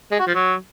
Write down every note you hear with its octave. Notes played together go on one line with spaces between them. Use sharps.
G#3
F#4
F3
F#3